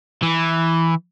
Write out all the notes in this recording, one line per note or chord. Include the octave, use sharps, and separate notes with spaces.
E3